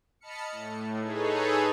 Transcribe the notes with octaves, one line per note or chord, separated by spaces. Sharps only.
D#5 A5 B5 F6 C#7
A2
D#4 G#4 A4 B4 C#5